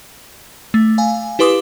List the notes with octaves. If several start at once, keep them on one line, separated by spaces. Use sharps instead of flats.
A3
F5 G#5
E4 G4 B4 C6 D6 D#6